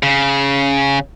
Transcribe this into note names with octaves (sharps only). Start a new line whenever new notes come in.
C#3